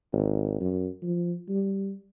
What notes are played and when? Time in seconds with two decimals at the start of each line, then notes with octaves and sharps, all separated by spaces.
0.12 G#1
0.61 F#2
1.02 F3
1.49 G3